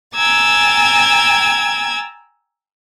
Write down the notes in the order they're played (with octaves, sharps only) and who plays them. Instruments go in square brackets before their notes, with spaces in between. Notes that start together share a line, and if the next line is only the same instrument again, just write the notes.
[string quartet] G5 G#5 A#5 E6 G#6 A6